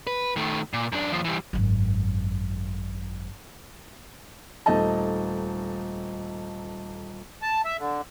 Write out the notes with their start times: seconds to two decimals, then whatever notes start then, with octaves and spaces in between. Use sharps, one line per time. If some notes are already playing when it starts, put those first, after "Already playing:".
0.07 B4
0.36 D#3 A3
0.73 A#2
0.92 F#2 D4
1.12 D#2 F3
1.25 E3 G3
1.53 G#1 F#2
4.66 D#1 A3 D#4 D#5 A5
7.42 A5
7.65 E5
7.78 D3